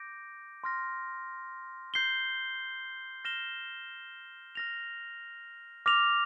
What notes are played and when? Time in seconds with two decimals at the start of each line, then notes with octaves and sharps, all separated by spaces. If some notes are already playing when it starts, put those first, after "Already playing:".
Already playing: D6 G6 A#6 D7
0.64 C6 F6 A#6
1.94 G6 C7 G7
3.25 F6 A#6 E7 G7
4.55 F6 A#6 F7
5.86 D6 F6 A#6 F7